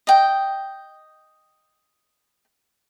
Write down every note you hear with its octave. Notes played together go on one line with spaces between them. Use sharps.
D#5 G5